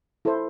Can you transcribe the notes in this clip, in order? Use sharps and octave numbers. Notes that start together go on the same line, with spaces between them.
E4 A4 C5